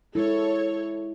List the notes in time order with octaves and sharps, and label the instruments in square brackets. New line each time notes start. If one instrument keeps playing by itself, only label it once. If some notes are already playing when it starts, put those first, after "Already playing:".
[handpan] G#3 E4 [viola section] A4 C#5